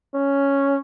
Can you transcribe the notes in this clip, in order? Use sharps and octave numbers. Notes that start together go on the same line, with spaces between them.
C#4